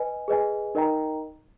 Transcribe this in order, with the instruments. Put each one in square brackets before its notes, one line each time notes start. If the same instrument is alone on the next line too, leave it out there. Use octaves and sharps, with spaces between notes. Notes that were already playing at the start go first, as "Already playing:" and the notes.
Already playing: [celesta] B4 D#5 G#5
G#4 B4 D#5 G#5
D#4 A#4 D#5 G5 A#5